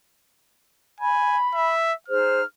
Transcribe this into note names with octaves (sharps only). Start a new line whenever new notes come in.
G#5 B5
E5
D#4 G#4 C5 F6